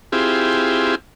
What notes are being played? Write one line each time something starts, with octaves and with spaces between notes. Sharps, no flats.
C4 E4 F4 G4 G#4